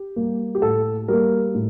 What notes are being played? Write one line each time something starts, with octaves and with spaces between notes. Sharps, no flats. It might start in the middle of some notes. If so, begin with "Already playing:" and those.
Already playing: G4
G3 A#3
G4
A2 A4
G3 A#3 A#4
A2